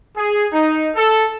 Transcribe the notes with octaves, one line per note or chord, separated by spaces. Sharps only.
G#4
D#4
A4